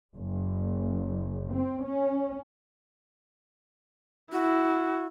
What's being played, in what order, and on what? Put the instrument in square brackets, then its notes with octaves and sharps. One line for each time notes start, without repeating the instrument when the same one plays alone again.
[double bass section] F#1
C4
C#4
[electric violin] E4 [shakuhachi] F#4